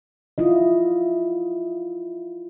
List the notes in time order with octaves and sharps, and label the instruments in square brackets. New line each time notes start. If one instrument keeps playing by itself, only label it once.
[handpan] E4 F4 D#5